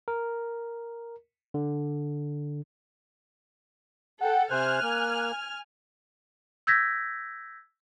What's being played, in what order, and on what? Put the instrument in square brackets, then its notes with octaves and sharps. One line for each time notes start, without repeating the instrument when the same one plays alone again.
[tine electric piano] A#4
D3
[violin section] A4 [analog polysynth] F#5 G5
[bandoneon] C3 C5 [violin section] G#5 F6 [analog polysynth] F#6
[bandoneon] A#3
[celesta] E6 G6 G#6 A#6 B6